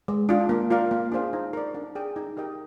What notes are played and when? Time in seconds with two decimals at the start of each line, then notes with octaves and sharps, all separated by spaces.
0.08 G#3
0.29 D4 F4
0.49 A#3
0.71 F4 A#4 D5 F5
0.91 A#3
1.12 D4 G#4 C5 F5
1.33 D#4
1.53 A#4 D5
1.74 D4
1.95 G#4 D5 G5
2.16 D#4
2.37 G4 A#4 D#5 G5